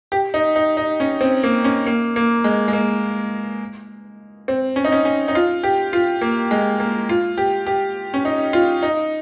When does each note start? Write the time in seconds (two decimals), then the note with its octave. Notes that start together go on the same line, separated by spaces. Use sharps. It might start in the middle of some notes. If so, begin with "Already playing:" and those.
0.12 G4
0.34 D#4
0.56 D#4
0.77 D#4
1.00 C#4
1.21 C4
1.43 A#3
1.64 C#4
1.86 A#3
2.16 A#3
2.44 G#3
2.68 G#3
2.73 A#3
4.48 C4
4.76 C#4
4.85 D#4
4.92 C#4
5.05 C#4
5.28 D#4
5.35 F4
5.63 G4
5.93 F4
6.21 A#3
6.51 G#3
6.80 A#3
7.09 F4
7.38 G4
7.66 G4
8.14 C#4
8.25 D#4
8.53 F4
8.83 D#4